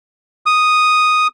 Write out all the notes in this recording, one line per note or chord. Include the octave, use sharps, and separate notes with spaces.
D#6